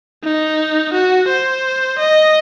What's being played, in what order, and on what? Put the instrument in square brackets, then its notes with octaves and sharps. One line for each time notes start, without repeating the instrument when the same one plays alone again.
[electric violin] D#4
F#4
C5
D#5